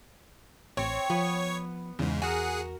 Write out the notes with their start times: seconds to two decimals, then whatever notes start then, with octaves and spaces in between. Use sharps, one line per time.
0.77 A1 C4 C#5 C#6
1.10 F3 B3
1.99 E2 G#2 C#3
2.22 F#4 G#4 A#4 F#5